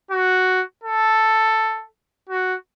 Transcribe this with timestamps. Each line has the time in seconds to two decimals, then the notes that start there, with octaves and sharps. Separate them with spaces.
0.11 F#4
0.83 A4
2.29 F#4